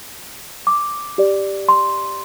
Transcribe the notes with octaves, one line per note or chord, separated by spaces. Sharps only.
D6
G4 D5
C6